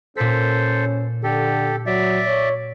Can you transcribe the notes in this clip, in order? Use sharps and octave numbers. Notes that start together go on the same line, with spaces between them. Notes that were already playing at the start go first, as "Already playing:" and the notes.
A#2 C#4 A4 C5 B6
D3 G4 A4
F#3 D5 E5
C#5